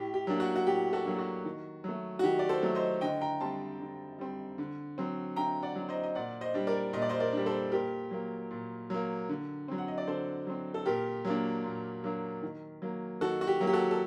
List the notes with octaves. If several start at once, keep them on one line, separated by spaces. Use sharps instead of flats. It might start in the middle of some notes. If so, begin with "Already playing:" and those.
Already playing: A2 G4
G4
F#3 A#3 D4
F#4
F#4
A2 G4
F#4 A4
F#3 A#3 D4
F#4
D#3
F#3 A3
F#4
D#3 G4
D5
A4 C5
F#3 A3
C5 D#5
D3 D#5 G5
G5 A#5
G3 C4 A5 C6
D3
G3 C4
D3
F#3 C4
D3 G5 A#5
D5 F#5
F#3
C4
C5 D#5
D#5
A#2 D5 F#5
C5 D#5
G3 D4
A#4 D5
A#2 D#5
D5
C5 D#5
A#4 D5
G3 D4
A4 C5
A#2 G4 A#4
F#3 A#3
A#2
F#3 A#3
D3
F#3 C4
F#5
D#5
D5
D3 A4 C5
F#3 C4
A4
A#2 G4 A#4
F#3 A#3 D4
A#2
F#3 A#3 D4
D#3
F#3 A#3
D#3 F#4 A4
F#4
G4
F#3 A#3
G4
F#4 A4
A4